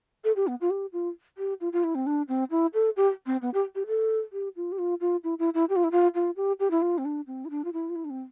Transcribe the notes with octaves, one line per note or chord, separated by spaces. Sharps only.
A4
G4
B3
F4
G4
F4
G4
F4
F4
E4
C4
D4
C4
E4
A4
G4
C4
B3
G4
G4
A4
G4
F4
G4
F4
F4
E4
E4
E4
G4
F4
E4
F4
F4
G4
G4
E4
F4
C4
D4
C4
E4
D4
F4
E4
F4
E4
D4
C4